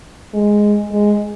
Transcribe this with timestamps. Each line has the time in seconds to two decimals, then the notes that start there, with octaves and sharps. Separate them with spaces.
0.34 G#3
0.92 G#3